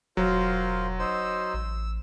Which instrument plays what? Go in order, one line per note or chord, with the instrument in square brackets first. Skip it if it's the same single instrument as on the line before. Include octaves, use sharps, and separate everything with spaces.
[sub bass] E1 [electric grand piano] F#3 [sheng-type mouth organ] F4 A#4 C5
[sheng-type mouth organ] D#4 C5 E6
[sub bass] A1 [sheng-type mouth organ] E6